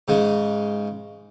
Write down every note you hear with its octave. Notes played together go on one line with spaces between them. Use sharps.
G#2 C#3 G#3